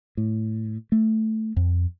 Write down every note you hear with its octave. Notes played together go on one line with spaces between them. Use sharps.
A2
A3
F2